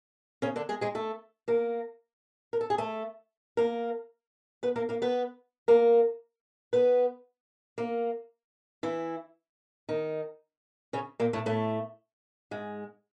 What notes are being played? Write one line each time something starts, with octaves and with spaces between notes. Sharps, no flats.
C#3 C#4
D3 D4
G#3 G#4
G#3 G#4
A3 A4
A#3 A#4
A#4
A4
G#4
A3 A4
A#3 A#4
B3 B4
A#3 A#4
A#3 A#4
B3 B4
A#3 A#4
B3 B4
A#3 A#4
E3 E4
D#3 D#4
C#3 C#4
A#2 A#3
A2 A3
A2 A3
G#2 G#3